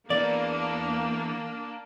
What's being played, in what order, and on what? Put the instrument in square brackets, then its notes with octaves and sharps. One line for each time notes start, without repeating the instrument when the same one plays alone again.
[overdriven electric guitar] E3 B3 [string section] A#3 D4 [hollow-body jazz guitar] D5